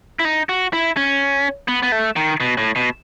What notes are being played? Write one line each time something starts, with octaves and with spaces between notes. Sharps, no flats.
E4
D#4
F#4
E4
C#4
B3
B3
A3
D#3
B2
A2
B2